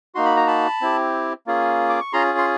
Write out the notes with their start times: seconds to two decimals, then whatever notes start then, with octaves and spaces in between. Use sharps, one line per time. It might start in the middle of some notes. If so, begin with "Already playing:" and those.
0.15 A#3 D#4 F#4 C6
0.25 B5
0.37 A#5
0.47 A5 B5
0.81 C4 E4 G4
1.47 A#3 C#4 F4 G#4
1.89 D6
2.01 C#6
2.13 C#4 F4 G#4 A#5 C6
2.38 C6